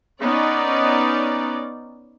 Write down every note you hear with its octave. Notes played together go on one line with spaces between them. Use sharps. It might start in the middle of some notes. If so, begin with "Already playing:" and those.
B3 C#4 D#4 D5